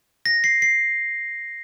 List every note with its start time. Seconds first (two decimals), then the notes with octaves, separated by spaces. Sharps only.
0.26 A#6
0.44 C7
0.62 C7